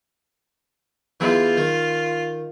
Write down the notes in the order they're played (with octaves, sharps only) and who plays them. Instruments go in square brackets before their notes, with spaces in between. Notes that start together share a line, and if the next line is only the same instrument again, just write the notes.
[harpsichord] E2 E3 [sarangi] F4
[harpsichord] D#3